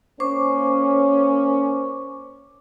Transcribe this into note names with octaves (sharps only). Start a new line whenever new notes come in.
A#3 C#4 C5 C#6 D6